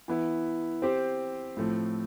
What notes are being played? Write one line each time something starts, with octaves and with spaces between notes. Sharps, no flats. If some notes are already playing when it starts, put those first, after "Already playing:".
E3 B3 E4
C4 G4 C5
A2 F3 A3 C4